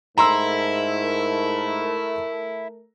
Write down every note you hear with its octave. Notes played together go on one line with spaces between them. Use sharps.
G#2 A3 E4 A#4 A#5 C6 E6